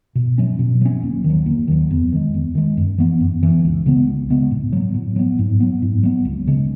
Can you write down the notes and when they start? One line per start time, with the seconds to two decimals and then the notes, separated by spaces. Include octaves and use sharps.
0.15 B2
0.38 F#3 C#4
0.59 B2
0.81 F#3 C#4
1.03 D#2
1.24 D#3
1.30 F#3
1.46 D#2
1.68 D#3 F#3
1.91 E2
2.12 D#3 G#3
2.34 E2
2.55 D#3 G#3
2.77 F#2
2.98 E3 B3
3.20 F#2
3.42 E3 B3
3.64 C#2
3.86 C#3 G#3 B3
4.07 C#2
4.30 C#3 G#3 B3
4.51 A2
4.73 F#3 B3
4.94 A2
5.16 F#3 B3
5.39 G#2
5.60 F#3 B3
5.82 G#2
6.03 F#3 B3
6.25 C#2
6.47 C#3 G#3 C#4